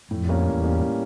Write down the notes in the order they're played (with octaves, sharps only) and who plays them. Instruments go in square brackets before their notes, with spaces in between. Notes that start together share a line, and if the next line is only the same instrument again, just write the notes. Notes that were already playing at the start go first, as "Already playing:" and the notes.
[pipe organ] F2 [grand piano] A2
[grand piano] G3 A#3 C#4
[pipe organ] E2 [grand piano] A2
[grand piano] G3 A#3 C#4
A2